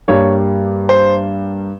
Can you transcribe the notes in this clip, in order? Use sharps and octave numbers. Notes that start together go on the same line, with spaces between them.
G2 G3 A#3 C#5
C5